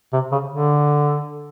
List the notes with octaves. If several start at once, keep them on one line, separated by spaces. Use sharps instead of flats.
C3
C#3
D3